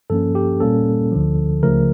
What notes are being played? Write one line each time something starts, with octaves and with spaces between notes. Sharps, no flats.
G2 F3 A#3 C#4 A4
G4
A#2 G3 A#3 C#4 A4
D2 D3 F3
C#2 C#3 F3 A3 A#4